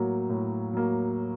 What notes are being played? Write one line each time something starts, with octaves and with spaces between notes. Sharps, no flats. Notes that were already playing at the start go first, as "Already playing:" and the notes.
Already playing: A2 F#3 A#3
A2
F#3 A#3